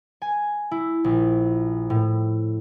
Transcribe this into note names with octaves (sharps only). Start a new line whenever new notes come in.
G#5
E4
A#1
A2